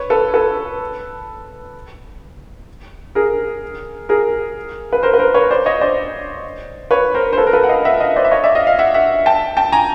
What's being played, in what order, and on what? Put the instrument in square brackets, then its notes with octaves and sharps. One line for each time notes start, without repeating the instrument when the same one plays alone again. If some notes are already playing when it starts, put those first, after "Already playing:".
Already playing: [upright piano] B4 C#5
A4 B4
A4 B4
G#4 A#4
G#4 A#4
B4
A#4 C5
B4
A#4 C5
B4 C#5
C5 D5
C#5 D#5
C5 D5
B4 C#5
A#4 C5
C5
A4 B4
A#4
A4 B4
F#5
D#5 F5
E5 F#5
D#5 F5
C5 D5
E5
C#5 D#5
D5 E5
D#5 F5
D#5 F5
E5 F#5
E5 F#5
G5 A5
G5 A5
G#5 A#5